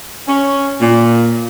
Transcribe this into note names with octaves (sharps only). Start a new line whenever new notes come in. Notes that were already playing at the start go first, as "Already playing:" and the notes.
C#4
A#2